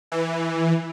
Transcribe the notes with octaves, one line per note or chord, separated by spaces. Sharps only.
E3